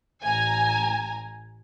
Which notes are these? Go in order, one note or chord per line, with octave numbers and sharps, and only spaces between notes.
A1 G#5 A#5